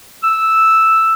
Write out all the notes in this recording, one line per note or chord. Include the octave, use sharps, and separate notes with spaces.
E6